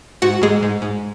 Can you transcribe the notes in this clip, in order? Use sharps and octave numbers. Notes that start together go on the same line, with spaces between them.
G#2 F#4 F#5
G#2 G#3 G#4
G#2
G#2